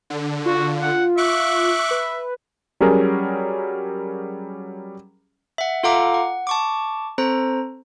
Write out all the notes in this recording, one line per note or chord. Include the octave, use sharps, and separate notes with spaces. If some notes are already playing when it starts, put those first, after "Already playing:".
D3
F4 F#4
F#5
E5 C#6 D6 F#6
B4
F#3 G3 C#4 G#4 A#4
E5 F#5
F4 A4 F5 F#5 A#5 D6
F#5
A5 C#6 D6
C4 A4 C5 A#5